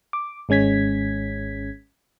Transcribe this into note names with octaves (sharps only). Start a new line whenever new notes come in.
D6
G#1 G#3 C#4 G#6 B6